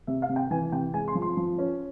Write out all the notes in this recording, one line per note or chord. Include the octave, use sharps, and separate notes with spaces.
C3 E5
F5
C3
G5
E3 G#5
C3 G5
G#3 G#5
C6
F3
C6
F3
C#4